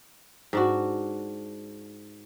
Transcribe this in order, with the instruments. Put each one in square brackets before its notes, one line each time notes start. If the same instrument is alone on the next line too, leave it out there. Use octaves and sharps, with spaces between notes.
[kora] G#2 D4 F#4